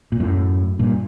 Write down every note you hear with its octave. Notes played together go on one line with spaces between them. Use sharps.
A#2
F#2 A2
G2 A#2